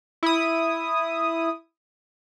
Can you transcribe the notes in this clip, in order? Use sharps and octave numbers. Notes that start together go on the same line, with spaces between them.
E4 D#6